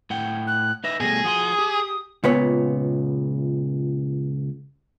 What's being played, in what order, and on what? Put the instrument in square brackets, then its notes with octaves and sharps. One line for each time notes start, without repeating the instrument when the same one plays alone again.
[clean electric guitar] A2 F#5 G5
[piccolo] F#6
[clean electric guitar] D#4 B4 E5 [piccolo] A#6
[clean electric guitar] B2 G3 A3 [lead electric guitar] G#4 [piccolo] A#6
[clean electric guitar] F3 F#4 C6 [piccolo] D#6
[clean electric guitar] G4
[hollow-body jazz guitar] C#2 A#2 B3 C#5